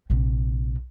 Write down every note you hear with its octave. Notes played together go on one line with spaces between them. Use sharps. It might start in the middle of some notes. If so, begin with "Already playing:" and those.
A#1 C3